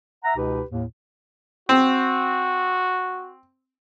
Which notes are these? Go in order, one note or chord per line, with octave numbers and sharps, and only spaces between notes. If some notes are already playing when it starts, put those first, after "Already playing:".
E5 F#5 A#5
C#2 B2 D#4 G4 B4
D#2 A2
C4 F#4